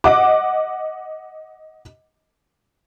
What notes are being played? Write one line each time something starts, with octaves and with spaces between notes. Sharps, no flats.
D#5 F#5 D6